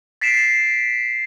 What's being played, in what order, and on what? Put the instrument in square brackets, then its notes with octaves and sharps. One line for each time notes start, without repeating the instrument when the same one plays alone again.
[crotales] A6 B6 C7 D7 E7